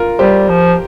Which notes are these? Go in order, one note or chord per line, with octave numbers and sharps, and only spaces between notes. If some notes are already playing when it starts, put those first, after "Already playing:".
Already playing: F4 A#4
G3 G4 C5
F3